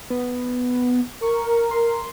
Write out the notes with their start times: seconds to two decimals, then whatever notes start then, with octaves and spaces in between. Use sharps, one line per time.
0.10 B3
1.22 A#4 C#6
1.71 C6